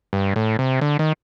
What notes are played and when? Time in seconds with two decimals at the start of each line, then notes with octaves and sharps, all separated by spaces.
0.13 G2
0.36 A2
0.59 C3
0.81 D3
0.99 D#3